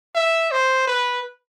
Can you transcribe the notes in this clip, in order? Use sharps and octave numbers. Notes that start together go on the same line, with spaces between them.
E5
C5
B4